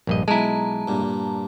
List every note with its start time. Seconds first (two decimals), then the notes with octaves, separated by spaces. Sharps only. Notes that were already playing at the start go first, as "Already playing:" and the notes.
0.07 A#1 G2 D#5
0.28 B1 G#3 E4 A5 A#5
0.87 G2 A#2